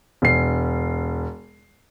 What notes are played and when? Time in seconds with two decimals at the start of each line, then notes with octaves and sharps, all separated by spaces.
0.22 E1 C7